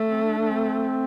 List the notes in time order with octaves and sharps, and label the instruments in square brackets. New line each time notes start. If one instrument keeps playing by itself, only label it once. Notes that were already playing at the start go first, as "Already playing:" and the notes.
Already playing: [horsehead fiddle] A3
[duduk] C4
D4
D4
C4